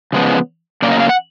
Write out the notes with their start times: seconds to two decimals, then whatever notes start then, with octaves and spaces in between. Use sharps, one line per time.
0.13 C#3 F3 G#3 B3
0.82 C#3 F#3 A#3 D5
0.91 D#5
1.00 F5
1.09 F#5